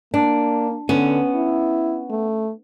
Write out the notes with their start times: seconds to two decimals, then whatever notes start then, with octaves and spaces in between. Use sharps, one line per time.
0.14 A#3 D4
0.89 D3 B3 C#4
1.34 E4
2.10 A3